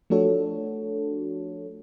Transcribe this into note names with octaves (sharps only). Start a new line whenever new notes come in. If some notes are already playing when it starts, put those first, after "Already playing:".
F3 A3 D4 F#4 A4 C#5